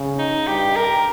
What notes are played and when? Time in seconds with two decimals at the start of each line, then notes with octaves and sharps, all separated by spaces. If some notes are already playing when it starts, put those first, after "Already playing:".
Already playing: C#3
0.19 D#4
0.47 G2 G4
0.76 A#4